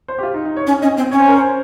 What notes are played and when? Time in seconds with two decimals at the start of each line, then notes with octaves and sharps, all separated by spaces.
0.08 C5
0.18 G4
0.23 F4
0.34 D#4
0.45 D#4
0.57 C#5
0.67 C#4 C#5
0.82 C#4 D#5
0.97 C4
1.11 C#4 C#5
1.20 C5
1.28 A#4
1.36 C5